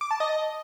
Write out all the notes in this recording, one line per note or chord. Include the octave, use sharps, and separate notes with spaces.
D6
A5
D#5